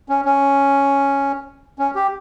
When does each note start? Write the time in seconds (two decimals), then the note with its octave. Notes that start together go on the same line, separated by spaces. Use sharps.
0.09 C#4
0.25 C#4
1.79 C#4
1.95 G4